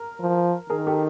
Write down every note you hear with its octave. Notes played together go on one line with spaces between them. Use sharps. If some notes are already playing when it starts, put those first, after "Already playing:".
Already playing: A#4
F3
D#3 G#4 A#4
G4 A4